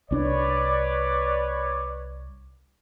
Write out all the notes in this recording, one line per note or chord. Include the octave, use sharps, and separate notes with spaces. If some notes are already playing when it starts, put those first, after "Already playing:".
C2 C#4 D4 B4 C#5 D5